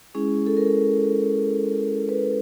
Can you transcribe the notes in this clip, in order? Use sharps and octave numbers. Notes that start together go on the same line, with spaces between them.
G#3 C#4 E4 G#4
A4
A#4
A4
B4